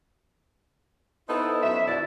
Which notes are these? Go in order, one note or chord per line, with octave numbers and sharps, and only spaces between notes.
B3 D#4 E4 A4 C5
F#2 E5
B2 D3 E4 D5 E5